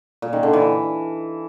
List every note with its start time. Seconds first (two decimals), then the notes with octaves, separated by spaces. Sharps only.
0.22 A#2
0.33 D#3
0.43 D3
0.53 E3